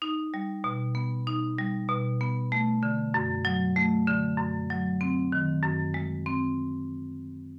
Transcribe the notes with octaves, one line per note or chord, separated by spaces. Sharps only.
D#4
G3
B2
B3
D#4
G3
B2
B3
A3
D3
F#2
F#3
A3
D3
F#2
F#3
C4
D#3
F#2
G#3
C4